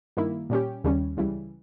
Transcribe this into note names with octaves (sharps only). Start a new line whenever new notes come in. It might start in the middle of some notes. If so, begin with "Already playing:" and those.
G2 D#3 A#3 E4
A#2 G3 C#4 G4
D#2 C#3 G3 C#4
C#2 C#3 E3 G3